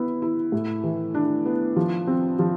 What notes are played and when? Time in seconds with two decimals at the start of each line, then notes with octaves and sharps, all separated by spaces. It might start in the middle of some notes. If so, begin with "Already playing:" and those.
Already playing: B3 E4
0.22 E4
0.52 A2
0.84 E3
1.15 D4
1.46 B3
1.76 F3
2.07 C4
2.39 F3